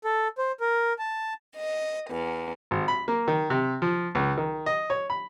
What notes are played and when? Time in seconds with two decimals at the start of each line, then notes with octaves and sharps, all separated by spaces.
0.04 A4
0.38 C5
0.60 A#4
0.99 A5
1.56 D#5
2.11 E2
2.71 G#1
2.88 B5
3.08 A#3
3.28 D#3
3.50 C3
3.82 F3
4.15 C#2
4.37 D#3
4.66 D#5
4.90 C#5
5.10 B5